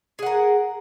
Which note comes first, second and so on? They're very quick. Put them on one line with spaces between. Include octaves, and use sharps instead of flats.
G#4 F#5 A#4